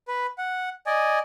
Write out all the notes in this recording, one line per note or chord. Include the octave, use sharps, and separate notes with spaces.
B4
F#5
D5 D#5 G#5